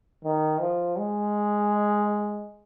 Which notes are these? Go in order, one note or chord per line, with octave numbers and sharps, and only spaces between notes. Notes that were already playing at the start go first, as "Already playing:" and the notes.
D#3
F3
G#3